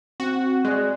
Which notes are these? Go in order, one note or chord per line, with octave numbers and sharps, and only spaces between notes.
C4 F#4
G#3 D5 F#6